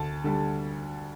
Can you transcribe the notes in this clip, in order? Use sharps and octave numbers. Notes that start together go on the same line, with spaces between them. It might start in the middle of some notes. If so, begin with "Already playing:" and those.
Already playing: D2 A5
D3 G3